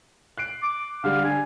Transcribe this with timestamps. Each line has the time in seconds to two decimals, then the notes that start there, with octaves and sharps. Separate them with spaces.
0.38 F#6 C7 D7
0.63 D6
1.04 D3 G3 F5
1.24 D4 G#5